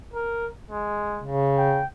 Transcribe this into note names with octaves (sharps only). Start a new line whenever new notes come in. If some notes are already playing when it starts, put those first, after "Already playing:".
A#4
G#3
C#3
G5